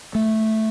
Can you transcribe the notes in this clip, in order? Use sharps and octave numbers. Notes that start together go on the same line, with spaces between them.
A3